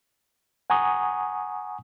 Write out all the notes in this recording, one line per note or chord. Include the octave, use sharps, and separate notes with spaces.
F#5 G#5 A#5 C#6 D#6